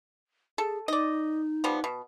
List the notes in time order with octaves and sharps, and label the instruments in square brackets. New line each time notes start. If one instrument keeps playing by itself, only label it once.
[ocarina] G#4 [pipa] A4
[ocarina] D#4 [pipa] D5 D#5
[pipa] F3 G3 B3
B2